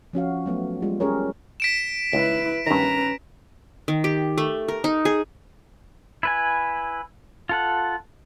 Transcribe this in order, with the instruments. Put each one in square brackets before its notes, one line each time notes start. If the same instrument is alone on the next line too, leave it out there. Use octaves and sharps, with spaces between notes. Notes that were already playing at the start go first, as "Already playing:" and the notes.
[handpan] F3 C#4 F#4 F5
F#3 A3 B3
G3 G#3 F4
C#4 G4 G#4 A#4 C#5
[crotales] B6 D7 E7
[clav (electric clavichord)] C#2 [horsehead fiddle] E4 B4
[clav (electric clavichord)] G2 D#3 [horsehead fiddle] C#4 B4 [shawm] A#5
[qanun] D#3
G4
A3
A#4
D#4
G#4
[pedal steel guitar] E4 B4 G#5
F4 A4 F#5